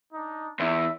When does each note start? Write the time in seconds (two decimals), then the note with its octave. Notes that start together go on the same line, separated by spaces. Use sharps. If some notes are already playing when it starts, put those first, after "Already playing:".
0.13 D4 D#4
0.60 E2 E5